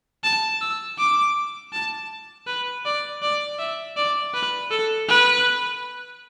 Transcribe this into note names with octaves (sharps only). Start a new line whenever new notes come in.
A5
E6
D6
A5
B4
D5
D5
E5
D5
B4
A4
B4